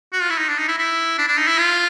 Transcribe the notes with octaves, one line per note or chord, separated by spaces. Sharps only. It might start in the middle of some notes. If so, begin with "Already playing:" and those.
F#4
F4
E4
D#4
D4
D#4
E4
E4
D4
D4
D#4
E4
F4